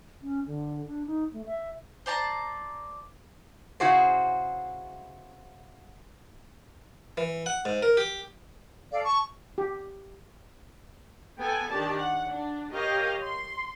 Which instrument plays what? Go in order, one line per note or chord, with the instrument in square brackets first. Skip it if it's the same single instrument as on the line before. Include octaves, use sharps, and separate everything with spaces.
[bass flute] C#4
D3
D4
D#4
A3
E5
[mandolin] C5 D5 A5 A#5
[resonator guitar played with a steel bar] C#3 E4 F#4 G#4 C5
[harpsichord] E3
F#5
G#2
A#4
G4
[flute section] A4 F5 [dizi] D5
[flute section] A5 [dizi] C#6
[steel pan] G4
[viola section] B3 A4 G5 G#5
D#3 D4 G4 D5 A5
F#5
D4
G4 A#4 C#5 D#5 F5 G5
C6